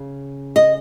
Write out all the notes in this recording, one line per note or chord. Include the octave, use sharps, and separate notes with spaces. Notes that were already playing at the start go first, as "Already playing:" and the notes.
Already playing: C#3
D#5